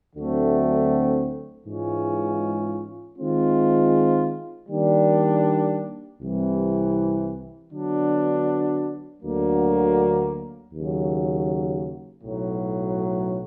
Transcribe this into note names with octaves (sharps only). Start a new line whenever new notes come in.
D2 D3 F#3 A3 C4
G#2 E3 G#3 C#4 F4
D#3 G#3 C4 F4
D#3 G3 A#3 D4
C2 C3 E3 G3
D3 F#3 B3 D4 F#4
D2 D3 F#3 A#3
D#2 C#3 F#3
B1 A2 F#3